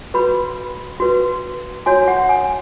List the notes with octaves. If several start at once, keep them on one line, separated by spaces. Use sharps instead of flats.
F#4 B4 B5
F#4 B4
F#4 C#5 G#5
F#5
G#5